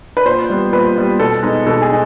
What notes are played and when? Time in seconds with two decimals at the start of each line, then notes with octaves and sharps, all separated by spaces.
0.17 B4
0.26 A#2 C5
0.50 G3 B3
0.73 A#2 B4
0.96 G3 B3
1.20 B2 A4
1.43 G#3 B3 D#4
1.67 B2 A4
1.82 G#4
1.90 D#4